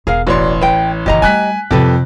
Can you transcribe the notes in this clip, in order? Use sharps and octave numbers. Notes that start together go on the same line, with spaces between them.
E1 G#4 A#4 F5
A1 F#4 C#5 D5 C6
B4 G5
F#1 D#3 G4 D#5 A#5
G3 A3 G#5 F#6 B6
F2 C3 G3 G4 A4 B4